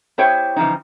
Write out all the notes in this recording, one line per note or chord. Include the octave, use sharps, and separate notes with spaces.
B3 E4 G4 C5 C#5 G5
C#3 E3 F3 G3 D#4